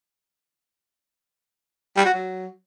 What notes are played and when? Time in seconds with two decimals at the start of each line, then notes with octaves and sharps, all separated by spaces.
1.97 G3
2.05 F#4
2.14 F#3